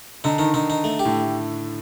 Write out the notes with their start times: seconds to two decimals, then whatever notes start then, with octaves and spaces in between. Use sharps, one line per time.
0.24 D3 D#4
0.38 D#3 D#4
0.54 D3 D#4
0.70 D#4
0.84 A3
0.99 G4
1.05 A2